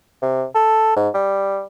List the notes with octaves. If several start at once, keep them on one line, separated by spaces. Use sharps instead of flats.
C3
A4
G#2
G3